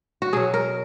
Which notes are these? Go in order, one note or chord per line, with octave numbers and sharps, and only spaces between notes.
F#4
B2 F#3 G#4
A#4